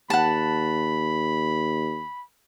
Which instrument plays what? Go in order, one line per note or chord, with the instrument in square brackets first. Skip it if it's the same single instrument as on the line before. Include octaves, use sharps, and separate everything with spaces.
[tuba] D#2 [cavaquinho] F#5 A5 [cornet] B5